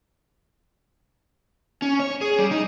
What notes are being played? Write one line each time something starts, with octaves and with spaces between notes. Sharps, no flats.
C#4
C#5
G#4
G3
D#4